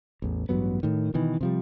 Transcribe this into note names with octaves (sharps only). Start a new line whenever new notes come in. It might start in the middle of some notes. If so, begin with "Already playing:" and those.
A1 E2
A1 G2 F#3 B3
A2 D#3
B2 D#3 E3
C3 F3 G3